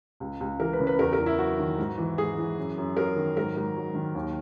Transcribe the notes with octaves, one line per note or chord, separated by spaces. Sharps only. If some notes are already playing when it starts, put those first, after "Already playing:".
C#2
C#2
E3 A#4
B4
C#3
B4
E2 A#4
A#4
E2
E4
F#3 F#4
D#3
G#2
E3
G#2 G#4
E3
F#2
F#2
F#3 A#4
D#3
G#2 A#4
G#2
F#3
D#3
D#2